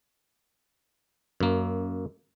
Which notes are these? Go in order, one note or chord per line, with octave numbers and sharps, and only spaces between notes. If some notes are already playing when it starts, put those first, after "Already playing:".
F#2 A#3